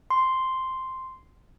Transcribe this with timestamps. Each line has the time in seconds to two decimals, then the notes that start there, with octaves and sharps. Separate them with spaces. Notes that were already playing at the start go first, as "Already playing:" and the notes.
0.10 C6